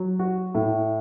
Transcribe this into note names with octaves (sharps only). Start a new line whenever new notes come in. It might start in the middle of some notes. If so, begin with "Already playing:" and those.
Already playing: F#3
F#4
A2